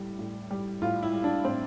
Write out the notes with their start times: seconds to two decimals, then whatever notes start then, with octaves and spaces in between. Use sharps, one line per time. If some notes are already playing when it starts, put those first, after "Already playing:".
Already playing: A2 G3
0.19 A2
0.51 G3
0.82 A2 F4
1.03 E4
1.13 G3
1.24 D4
1.44 A2 C4